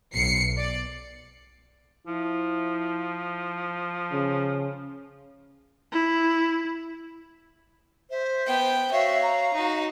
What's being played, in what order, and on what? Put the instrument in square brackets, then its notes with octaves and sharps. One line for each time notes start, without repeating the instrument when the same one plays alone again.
[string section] B1 C7 C#7
D5
[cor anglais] F3 [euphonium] E4
[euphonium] C#3
[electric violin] E4
[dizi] C5 [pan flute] E5
[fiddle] B3 G5
[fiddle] F#4 C#5 [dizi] E5 [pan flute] F5
[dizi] A#5
[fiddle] D#4 F#4